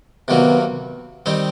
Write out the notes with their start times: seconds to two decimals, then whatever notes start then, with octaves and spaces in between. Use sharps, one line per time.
0.28 C3 D#3 F#3 A#3 B3
1.26 D#3 G3 C4 D#4